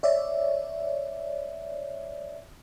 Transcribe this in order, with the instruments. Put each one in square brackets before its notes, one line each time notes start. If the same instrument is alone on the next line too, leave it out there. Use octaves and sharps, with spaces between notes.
[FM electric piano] C#5 D5 E5